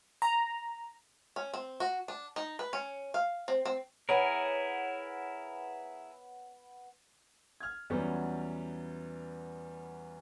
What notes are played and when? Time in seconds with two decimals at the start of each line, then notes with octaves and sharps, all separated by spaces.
0.22 A#5
1.36 C#4
1.54 C4
1.80 F#4
2.08 D4
2.36 D#4
2.59 B4
2.73 C#4
3.14 F5
3.48 C4
3.65 C4
4.09 B3 E4 G#4 A#4 C#5 F#5 G#5
7.60 F6 G#6
7.90 E2 F#3 G3 B3 C#4